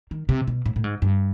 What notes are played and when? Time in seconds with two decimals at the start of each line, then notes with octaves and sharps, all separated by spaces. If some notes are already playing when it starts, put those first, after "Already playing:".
0.11 D#3
0.29 C3
0.47 B2
0.66 A2
0.76 A2
0.84 G#2
1.02 G2